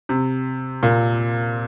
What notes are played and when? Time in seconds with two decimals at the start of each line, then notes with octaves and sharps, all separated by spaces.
0.09 C3
0.83 A#2